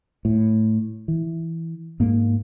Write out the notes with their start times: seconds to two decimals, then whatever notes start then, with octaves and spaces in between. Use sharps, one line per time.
0.25 A2
1.08 E3
2.00 G#2 A#3